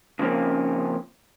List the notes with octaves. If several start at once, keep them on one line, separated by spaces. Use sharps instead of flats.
C#3 F3 A#3 C4 C#4